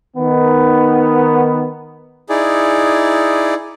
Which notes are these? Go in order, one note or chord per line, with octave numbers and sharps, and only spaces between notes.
D#3 B3
D#4 E4 G#4 D5